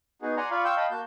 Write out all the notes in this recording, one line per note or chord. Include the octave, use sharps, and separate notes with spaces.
B3 D#4 F#4 G#4
D5 F#5 G#5 A#5 C6
F4 D5 F5 B5 C#6
F5 G5 C6 C#6 E6 G6
D#5 F5 G5 A5 B5
A#3 F#4 A5 G6